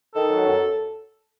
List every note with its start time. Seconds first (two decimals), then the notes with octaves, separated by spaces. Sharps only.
0.15 D#3 A4
0.30 F#3
0.45 F#2